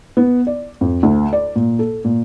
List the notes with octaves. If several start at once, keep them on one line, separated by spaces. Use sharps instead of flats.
B3
D5
F2
D2
D5
A#2
A4
A#2